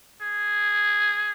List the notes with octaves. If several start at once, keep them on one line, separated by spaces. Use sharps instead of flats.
G#4